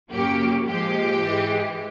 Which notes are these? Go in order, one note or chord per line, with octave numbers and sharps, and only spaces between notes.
F#2 C#3 F#3 A#3 G4
A#2 F3 G#3 G4
G#2 E3 G#3